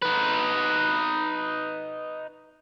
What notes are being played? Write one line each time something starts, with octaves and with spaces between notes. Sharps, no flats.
D#4 B4